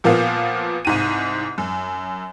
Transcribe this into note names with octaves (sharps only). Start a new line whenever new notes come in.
A#2 F3 A#3 B3 F4
C2 G#2 D#7
F#2